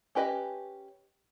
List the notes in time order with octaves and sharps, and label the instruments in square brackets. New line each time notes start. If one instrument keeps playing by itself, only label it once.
[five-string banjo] C#4 G4 B4 D#5 G#5